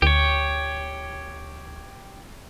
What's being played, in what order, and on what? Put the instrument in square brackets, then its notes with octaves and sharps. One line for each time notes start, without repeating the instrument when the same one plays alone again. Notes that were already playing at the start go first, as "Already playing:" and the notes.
[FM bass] D2 [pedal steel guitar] G4 C#5